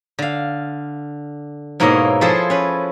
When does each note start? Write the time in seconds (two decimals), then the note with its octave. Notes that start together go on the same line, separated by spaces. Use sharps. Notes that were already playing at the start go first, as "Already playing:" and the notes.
0.19 D3 F5
1.80 G#2 B2 A#3 E4 C#5 D#5
2.21 F3 E4 F4 G#4 A4 C5
2.50 C#4 B4